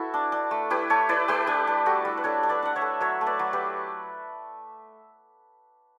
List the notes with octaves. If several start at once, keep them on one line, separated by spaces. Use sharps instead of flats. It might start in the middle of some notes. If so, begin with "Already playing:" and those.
Already playing: E4 F#4 A4 B4
D4
D4
A3
E4 G4 B4
A3 A4 C#5
E4 B4 D5
A3 G4 B4
D4 G4
D4
G3 F#4 A4
G3
B4
D4 A4 C#5
D4
B4 D5
D4 F#5
C#5 E5
A3
F#3 C#5 E5
A3
B4 D5
F#3
G4 B4